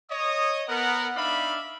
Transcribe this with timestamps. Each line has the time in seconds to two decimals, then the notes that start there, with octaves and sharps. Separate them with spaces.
0.10 C#5 D#5 D#6
0.68 B3 A#4 F#5
1.16 D4 D#4 D5 E5 F5 B5